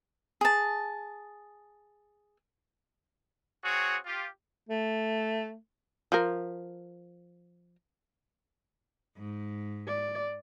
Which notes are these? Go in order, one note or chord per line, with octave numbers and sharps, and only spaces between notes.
G#4 A5
C4 F#4 G#4 C#5
F4 G4
A3
F3 A#4
G#2
D5